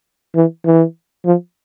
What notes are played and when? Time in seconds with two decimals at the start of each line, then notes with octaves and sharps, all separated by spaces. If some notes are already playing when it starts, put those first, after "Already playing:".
0.35 E3
0.65 E3
1.25 F3